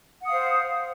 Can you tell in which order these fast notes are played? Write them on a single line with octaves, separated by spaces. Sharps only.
F#5 D#6 F5 C5